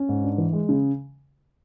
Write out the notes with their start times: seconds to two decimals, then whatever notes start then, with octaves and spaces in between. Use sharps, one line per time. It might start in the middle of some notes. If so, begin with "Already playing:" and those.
Already playing: C#4
0.09 G#2
0.24 D4
0.38 E3
0.53 G#3
0.69 C#3